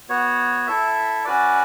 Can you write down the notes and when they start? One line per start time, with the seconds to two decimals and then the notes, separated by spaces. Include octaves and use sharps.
0.09 B3 F#4 C#5
0.67 E4 A4 E5
1.25 C#4 F#4 B4 D5